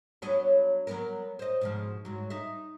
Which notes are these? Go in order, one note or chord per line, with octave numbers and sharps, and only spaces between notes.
F#3 B3 D4
F#3 B3 A#4
C5 D#5
G#2 B2 F3
G#2 F#3
D#4 E5